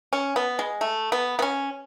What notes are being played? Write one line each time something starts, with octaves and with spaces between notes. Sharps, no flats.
C#4
B3
G#3
A3
B3
B3
C#4